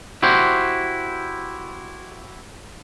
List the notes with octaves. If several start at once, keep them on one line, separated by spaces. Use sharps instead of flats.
E4 F#4 G4 C5